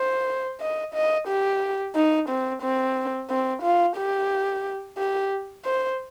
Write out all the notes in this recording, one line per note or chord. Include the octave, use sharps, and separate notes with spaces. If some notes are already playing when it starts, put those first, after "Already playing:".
Already playing: C5
D#5
D#5
G4
D#4
C4
C4
C4
F4
G4
G4
C5